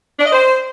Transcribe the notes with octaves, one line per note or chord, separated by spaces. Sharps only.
D4
D#5
C5